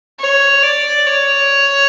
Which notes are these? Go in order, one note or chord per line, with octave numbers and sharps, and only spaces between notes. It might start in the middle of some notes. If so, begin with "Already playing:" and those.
C#5
D5
C#5